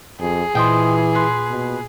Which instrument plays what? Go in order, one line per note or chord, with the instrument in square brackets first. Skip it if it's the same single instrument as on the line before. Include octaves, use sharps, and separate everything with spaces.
[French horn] F2 [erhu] G#4
[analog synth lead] A#2 [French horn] E3 [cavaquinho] C5 D#5 G5
[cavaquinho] B4 C6
[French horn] B2